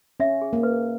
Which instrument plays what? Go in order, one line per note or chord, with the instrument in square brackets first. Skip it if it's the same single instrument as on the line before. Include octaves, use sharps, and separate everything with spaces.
[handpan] C#4 [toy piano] E5
[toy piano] G#4
[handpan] A#3
[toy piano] B4